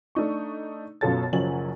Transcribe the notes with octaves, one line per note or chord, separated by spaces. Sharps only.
A3 D4 D#4 C#6
F#2 B2 F4 A4 C#5 A6
F#1 F3 F#3 C#4 G#5 F#7